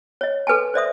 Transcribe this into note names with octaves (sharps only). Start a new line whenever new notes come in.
C#5 D#5
A4 B4 G#5 A5
C5 D5 E5 D#6